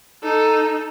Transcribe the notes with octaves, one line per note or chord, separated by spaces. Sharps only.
D#4 A4